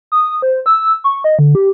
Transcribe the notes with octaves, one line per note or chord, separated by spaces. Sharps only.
D#6
C5
E6
C#6
D#5
D3
G4